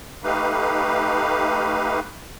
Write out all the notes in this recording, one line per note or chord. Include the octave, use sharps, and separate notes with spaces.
A3 D#4 G4 B4 F5